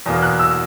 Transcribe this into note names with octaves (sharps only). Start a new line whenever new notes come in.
E2 B2 A#3
F#6
E6